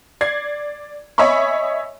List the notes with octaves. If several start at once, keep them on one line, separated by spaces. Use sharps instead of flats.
D5 G#6 C7
C#5 D#5 E5 G#5 B5 C#6